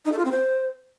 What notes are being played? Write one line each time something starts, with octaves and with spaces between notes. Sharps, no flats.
D#4
A4
F4
C4
C5